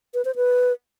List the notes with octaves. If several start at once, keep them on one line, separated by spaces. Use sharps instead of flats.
B4
C5
B4